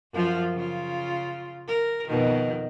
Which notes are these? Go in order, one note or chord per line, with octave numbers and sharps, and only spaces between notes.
F#2 F3 F4
C#3 F4
A#4
F2 B2 D#3